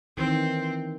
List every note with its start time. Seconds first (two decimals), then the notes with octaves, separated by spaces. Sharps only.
0.17 D#3 E3 C4